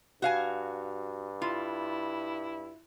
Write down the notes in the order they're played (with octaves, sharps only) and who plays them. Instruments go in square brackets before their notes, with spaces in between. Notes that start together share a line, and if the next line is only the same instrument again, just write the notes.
[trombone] G2 [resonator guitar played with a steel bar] F#4 F5 G#5
[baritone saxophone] E4 [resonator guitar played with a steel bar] F4